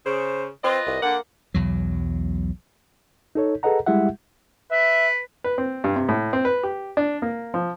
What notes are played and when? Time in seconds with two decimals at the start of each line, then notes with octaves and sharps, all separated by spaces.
0.06 C#3 C5
0.64 C4 F4 B4 D#5
0.86 C2
1.02 D3 A#3 F#5
1.54 B1 E2 F#3
3.35 D#4 A4 C#5
3.63 G#4 A4 B4 D#5 F#5 A#5
3.86 G3 G#3 E4 G4 E5 F#5
4.71 B4 E5
5.44 B4
5.58 C4
5.84 G2
5.96 C3
6.09 A2
6.33 C4
6.45 B4
6.63 G4
6.97 D4
7.22 A#3
7.54 F3